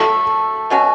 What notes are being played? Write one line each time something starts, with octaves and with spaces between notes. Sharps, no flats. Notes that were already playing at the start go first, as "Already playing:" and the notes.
Already playing: A3 F#4 A4 C#5 E5
B2 F#3 C#4 F#4